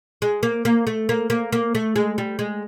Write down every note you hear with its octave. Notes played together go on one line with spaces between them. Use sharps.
G#3
A#3
A#3
A3
A#3
A#3
A#3
A3
G#3
G3
G#3